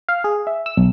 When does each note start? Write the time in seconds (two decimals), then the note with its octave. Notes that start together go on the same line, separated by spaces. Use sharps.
0.09 F5
0.24 G#4
0.47 E5
0.66 E6
0.77 B1